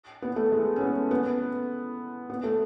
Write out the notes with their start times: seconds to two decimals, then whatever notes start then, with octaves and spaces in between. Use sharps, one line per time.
0.22 B3
0.36 A3
0.52 G#3
0.76 C#4
0.81 B3
1.11 B3
2.30 B3
2.44 A3